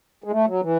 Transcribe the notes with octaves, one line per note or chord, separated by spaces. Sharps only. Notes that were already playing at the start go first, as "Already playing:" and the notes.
G#3
A3
F#3
E3